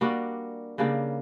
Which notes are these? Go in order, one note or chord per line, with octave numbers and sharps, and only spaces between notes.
G3 A#3 D4 F#4
C#3 G3 A#3 D4